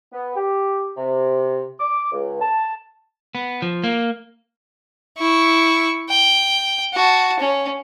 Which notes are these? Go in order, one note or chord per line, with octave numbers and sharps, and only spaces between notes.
B3
G4
C3
D6
C#2
A5
B3
F3
A#3
E4 C#6
G5
F#4 A5
C#4